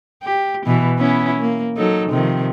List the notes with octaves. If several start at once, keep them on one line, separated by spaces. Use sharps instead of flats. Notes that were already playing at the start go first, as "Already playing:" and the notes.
G4
B2 E3
B3 C#4 E4
A#3
F#3 D#4 A4
C3 D#3 F3